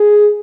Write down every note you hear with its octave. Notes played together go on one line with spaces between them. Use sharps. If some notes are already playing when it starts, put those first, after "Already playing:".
Already playing: G#4